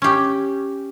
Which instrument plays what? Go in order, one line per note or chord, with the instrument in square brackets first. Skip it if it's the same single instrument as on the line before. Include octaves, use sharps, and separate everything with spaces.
[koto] C#4 G4